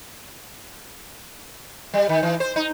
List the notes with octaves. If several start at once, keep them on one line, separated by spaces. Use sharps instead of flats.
G3
D#3
E3
C5
D#4